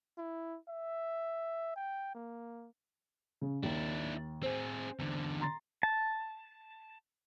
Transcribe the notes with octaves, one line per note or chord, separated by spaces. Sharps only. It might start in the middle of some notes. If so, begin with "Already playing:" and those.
E4
E5
G5
A#3
C#3
D#2 D4 E4
C4 G#4 C5
E2 D3
A#5 C6 A6
A5